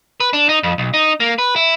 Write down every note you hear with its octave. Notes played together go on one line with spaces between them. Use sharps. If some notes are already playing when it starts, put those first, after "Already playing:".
B4
D4
D#4
F2
B1
D#4
A#3
B4
E4